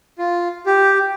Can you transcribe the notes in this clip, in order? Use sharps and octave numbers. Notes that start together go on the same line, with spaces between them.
F4
G4